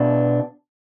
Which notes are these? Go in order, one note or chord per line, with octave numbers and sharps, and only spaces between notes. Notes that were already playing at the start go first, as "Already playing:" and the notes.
Already playing: B2 B3 D4